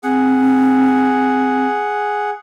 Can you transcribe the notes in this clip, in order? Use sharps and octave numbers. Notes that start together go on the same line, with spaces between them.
C4 G#4 F#5